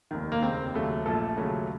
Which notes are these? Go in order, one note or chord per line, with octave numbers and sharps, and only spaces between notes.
F1 D#2 D#3
A#3
F1 D#2 C#3 C4
D#2 C#3 F#3 A3
A#1 A#2 F3 A3 A4
D#2 C#3 F#3 A3